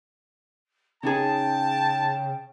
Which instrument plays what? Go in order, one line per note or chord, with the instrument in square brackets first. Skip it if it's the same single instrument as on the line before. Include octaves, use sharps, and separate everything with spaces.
[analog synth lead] C#3 [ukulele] C#4 D#4 G#4 [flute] G5 [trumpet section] A5